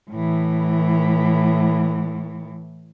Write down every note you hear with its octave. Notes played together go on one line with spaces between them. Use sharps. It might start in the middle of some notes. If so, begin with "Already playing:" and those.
A2 E3